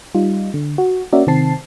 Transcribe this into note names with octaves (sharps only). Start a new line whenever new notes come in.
G3 D#4 F4
D3
F#4
A#3 C#4 F#4 A#4 D5 E5
C3 D#3 C4 A5 C7